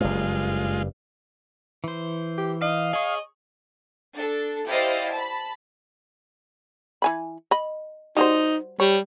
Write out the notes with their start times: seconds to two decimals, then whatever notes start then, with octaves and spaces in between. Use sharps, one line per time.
0.01 F#1 G2 G#3 F4
1.84 E3 C5
2.38 G4
2.62 D#5 F5
2.93 G#4 C#5 D#5
4.14 D4 A4
4.67 E4 G4 C5 D5 D#5 F5
5.12 A5 B5
7.02 E3 G#5 B5
7.51 D#5 B5
8.17 G3 D#4 F#4 C5
8.80 G3 C#5